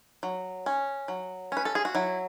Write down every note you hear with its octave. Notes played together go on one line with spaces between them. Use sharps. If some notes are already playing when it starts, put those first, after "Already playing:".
F#3
C#4
F#3
C#4 B4
A4
G#4
F#4
F#3 E4